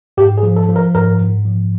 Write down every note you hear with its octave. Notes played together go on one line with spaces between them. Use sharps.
G#2 G4
G#4
F3
A4
F3
A#4
G#2 A#4
G#2
F3